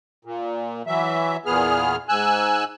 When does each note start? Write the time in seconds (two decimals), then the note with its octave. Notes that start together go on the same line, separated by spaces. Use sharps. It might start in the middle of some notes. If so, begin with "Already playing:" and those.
0.25 A#2
0.87 E3 F#3 E5
1.46 E2 A#2 B3 G#4 F6
2.09 G#2 G#5 E6 F#6